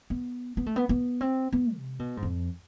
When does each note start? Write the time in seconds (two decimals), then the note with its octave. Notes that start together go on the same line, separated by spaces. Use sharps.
0.10 B3
0.57 B3
0.66 A3
0.76 B3
0.89 B3
1.21 C4
1.53 B3
1.75 C3
1.99 B2
2.17 G#2
2.23 F2